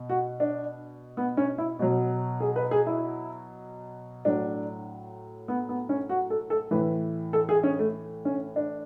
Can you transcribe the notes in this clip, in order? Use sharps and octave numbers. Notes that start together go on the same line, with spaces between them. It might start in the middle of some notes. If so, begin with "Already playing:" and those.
Already playing: B2
F#4
D4
B3
C#4
E4
B2 F#3
G#4
B4
G#4
E4
A2 F#3 D4
B3
B3
C#4
F#4
A4
A4
A2 E3 B4
A4
G#4
C#4
A3
C#4
D4